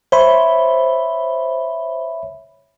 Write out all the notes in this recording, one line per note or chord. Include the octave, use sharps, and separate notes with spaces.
C5 C#5 E5 B5